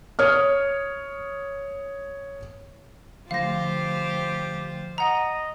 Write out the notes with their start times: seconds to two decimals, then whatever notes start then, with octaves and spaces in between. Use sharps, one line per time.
0.19 C#5 D#6 F6
3.31 D3 F3 A3 F4 G4 C5 F5 A#6
4.98 D#5 F#5 A#5